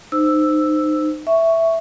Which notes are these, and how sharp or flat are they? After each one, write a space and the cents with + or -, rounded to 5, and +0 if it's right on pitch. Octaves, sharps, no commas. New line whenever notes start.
D#4 -30 C5 -10 E6 +0
E5 +0 C#6 +5